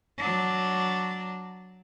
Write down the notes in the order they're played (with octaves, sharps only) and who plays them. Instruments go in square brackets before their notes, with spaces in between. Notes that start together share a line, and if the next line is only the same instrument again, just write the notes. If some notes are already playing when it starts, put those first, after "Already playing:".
[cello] F#3 D4